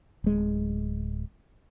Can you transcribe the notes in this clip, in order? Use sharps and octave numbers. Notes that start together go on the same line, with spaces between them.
D1 G#3